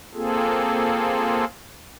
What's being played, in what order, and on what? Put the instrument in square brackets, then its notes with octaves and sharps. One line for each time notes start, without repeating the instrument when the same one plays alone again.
[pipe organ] A#3 C4 F4 G#4 A4